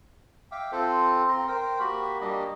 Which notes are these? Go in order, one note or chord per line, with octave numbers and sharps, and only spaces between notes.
E5 F5 G5 D6
C4 F4 A4 C5
C4 A#5 C6
A#4 C5 G5
A#3 F#4 G4 B5
G3 A#3 D4 D#5